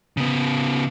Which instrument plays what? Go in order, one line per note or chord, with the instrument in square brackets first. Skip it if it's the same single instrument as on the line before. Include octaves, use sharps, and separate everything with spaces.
[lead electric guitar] C#3 B3